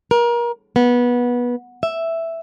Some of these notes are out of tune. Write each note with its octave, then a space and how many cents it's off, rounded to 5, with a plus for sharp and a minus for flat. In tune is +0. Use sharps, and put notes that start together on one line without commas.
A#4 +30
B3 -20
E5 +0